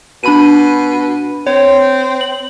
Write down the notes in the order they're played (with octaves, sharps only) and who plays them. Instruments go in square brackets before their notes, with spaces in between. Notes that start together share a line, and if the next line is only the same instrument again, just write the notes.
[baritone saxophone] B2 [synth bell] D4 B5 D#7
[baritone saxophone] C4 [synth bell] C#5
[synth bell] F#7